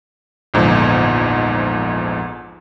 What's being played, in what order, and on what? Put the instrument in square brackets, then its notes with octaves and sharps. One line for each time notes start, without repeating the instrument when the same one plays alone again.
[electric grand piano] A#1 E2 G#2 D3 F3 D#4